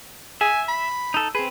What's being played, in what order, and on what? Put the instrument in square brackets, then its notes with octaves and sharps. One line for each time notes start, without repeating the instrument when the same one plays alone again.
[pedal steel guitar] E5 [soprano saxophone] G#5
[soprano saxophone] B5
[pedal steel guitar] D#4 A4
[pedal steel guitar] C4 B4 [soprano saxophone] G#4